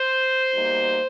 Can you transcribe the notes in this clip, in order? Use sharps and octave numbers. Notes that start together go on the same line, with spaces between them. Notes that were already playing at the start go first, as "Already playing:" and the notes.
Already playing: C5
B2 G3 A#3 D#4